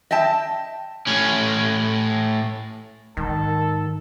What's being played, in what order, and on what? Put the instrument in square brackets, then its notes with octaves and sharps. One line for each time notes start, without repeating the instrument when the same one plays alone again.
[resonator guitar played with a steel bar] D#5 E5 G5 A5
[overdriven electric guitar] A2 C#4
[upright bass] G#2 [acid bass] D#3 [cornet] A4